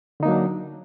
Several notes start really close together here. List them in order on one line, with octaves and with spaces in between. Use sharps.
D3 D#4 A#3 F#3 D4